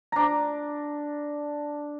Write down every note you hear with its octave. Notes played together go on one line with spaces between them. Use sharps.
D4 A#5